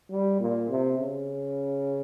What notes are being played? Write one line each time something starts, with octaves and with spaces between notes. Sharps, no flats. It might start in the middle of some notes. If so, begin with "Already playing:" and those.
G3
A#2
C3
C#3